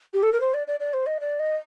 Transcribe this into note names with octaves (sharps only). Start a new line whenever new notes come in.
G4
A4
A#4
C5
D5
D5
D5
C5
D#5
D5
D#5